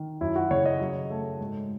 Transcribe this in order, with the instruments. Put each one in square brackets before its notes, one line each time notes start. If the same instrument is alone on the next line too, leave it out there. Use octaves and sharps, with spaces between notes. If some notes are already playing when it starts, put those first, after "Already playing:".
Already playing: [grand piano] D#3
F#2 E4
F#4
C#3 C#5
D#5
F#3
A3
G#2